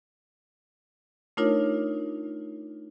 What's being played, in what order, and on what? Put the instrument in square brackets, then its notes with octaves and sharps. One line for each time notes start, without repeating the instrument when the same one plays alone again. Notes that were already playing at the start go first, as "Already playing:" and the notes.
[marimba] A3 D4 D#4 F4 A#4 C#5